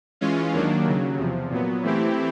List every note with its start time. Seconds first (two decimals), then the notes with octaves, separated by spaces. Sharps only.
0.21 E3 G#3 C#4 F4
0.54 D#2 D#3 F#3 A#3 D4
0.86 D#2 C#3 F#3
1.18 E2 C3 F3
1.51 A#2 F#3 B3
1.83 E3 A3 C4 E4 G4